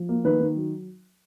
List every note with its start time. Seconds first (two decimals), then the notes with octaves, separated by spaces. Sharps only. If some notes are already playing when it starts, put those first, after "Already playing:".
Already playing: F3
0.09 A#3
0.24 D#3 B4
0.40 D#3
0.56 F#3